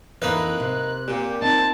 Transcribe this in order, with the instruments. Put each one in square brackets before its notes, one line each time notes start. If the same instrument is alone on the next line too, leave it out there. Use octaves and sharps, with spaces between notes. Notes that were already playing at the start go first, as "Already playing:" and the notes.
[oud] F2 E3 [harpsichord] A#3 D#4 B4 [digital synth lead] F#6
[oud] C3
[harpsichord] A#2 [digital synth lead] G4
[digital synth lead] C4 [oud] D#4 [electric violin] A5